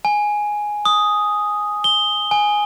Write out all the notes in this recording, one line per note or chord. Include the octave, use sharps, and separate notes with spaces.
G#5
D#6
G7
G#5